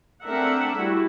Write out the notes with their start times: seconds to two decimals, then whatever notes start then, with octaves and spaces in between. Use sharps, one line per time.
0.23 A3 C4 D4 A#4 E5 F#5
0.76 G3 A3 E4 F#4